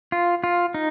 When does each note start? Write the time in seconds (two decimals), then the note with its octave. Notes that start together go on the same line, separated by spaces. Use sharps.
0.12 F4
0.44 F4
0.74 D#4